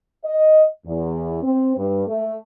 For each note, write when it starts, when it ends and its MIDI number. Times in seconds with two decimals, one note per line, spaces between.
0.25 0.64 75
0.87 1.43 40
1.43 1.76 60
1.77 2.04 43
2.07 2.36 57